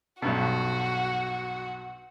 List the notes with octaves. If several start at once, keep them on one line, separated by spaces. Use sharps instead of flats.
B1 G2 B2 F#4